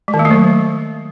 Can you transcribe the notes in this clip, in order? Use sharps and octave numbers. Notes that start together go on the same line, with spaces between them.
G#3
D#3
A#3
A3
F#3